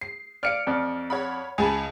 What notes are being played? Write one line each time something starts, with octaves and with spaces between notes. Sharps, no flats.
C7
D5 F5 F6 C#7 D7
F2 D5
C#5 F#5 B5
C#2 G#4 G#5 A5 B5